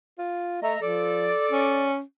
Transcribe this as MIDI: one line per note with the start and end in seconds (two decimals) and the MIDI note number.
0.19 0.57 65
0.63 0.74 57
0.63 0.80 75
0.63 0.80 76
0.63 0.80 82
0.82 1.31 53
0.82 1.91 69
0.82 1.91 74
1.52 2.01 61